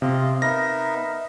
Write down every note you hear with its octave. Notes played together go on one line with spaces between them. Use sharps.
C3 F4 D#5 F5
B3 D#4 A#4 E5 A#6